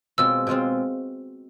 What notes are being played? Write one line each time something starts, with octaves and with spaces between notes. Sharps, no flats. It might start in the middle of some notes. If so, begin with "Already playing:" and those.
B2 G#3 C4 F4 E6
B2 G#3 C4 F4